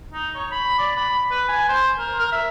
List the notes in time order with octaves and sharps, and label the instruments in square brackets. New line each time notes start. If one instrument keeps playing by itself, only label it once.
[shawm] D#4
C#5
B5
D5
B5
B4
G#5
C5
A#4
A#4
E5